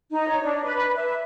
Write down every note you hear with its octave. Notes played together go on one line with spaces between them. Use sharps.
D#4
C#5
D4
B4
E5